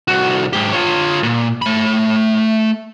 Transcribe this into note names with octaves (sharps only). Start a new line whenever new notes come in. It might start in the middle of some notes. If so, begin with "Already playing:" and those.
C2 F#4
G#2 G4
F4 C#5
A#2
A3 B5